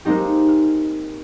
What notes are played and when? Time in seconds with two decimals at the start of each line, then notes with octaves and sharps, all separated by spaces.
0.05 G#3 A#3 C4 D#4 G4
0.49 F6